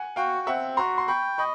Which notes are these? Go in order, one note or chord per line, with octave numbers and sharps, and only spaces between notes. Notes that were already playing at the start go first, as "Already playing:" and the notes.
Already playing: F#5 G#5
F#4 F5 G5
C4 E5 F#5
F#4 A#5 C6
C6
G5 B5 C#6
D#5 B5 C#6